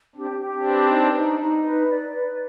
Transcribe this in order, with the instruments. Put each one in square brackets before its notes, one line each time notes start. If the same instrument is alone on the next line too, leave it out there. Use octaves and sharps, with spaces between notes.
[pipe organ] C4 D4 [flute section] G4
[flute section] G4
[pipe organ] C4 D4
[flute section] B4
D#4
D#4
D#4
B4
D5
B4